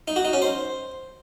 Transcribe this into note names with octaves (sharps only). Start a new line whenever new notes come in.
D#4
F#4
D#4
C#4
C5